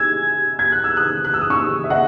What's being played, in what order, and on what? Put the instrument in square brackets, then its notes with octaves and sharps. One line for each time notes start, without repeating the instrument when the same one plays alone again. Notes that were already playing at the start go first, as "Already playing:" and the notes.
Already playing: [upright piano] G#5 E6 G#6
G#6
F#6
E6
D#6 F#6
F#6
E6
D#6
C#6 E6
E5
D#5 F#5